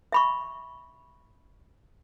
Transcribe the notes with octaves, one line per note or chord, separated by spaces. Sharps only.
E5 B5 C#6